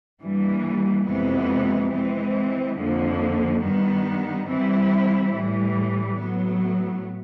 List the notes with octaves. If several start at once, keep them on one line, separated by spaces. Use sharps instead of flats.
G2 E3 G3 A#3
F2 C3 E3 G#3 B3
E3 G#3 C4
F2 D3 F3 A#3
G2 D#3 G3 B3
E3 G3 C4 E4
A2 E3 G3
A2 F#3 B3